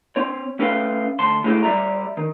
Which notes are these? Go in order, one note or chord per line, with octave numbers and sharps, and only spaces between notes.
C4 C#5
A3 C#4 A4 B4 F5 G5
D2 A5 C6
A2 C3 G#3 A3 E4 G4
G3 G4 D5 E5 A#5
D#3